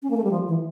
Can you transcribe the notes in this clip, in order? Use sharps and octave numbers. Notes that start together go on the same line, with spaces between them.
C#4
A#3
A3
G3
F3
E3